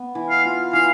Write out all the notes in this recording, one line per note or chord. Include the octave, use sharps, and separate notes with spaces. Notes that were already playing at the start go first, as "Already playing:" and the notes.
Already playing: B3
E3
F5
F4
E3 F5